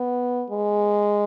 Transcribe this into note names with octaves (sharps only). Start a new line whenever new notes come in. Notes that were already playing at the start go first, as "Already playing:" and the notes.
Already playing: B3
G#3